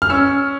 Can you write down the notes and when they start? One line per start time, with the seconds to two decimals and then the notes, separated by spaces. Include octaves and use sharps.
0.02 F6
0.10 C#4 E6